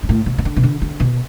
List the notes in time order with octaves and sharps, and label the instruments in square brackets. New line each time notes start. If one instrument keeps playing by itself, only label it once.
[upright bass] G2
A2
B2
B2
D3
B2
D3
D3
B2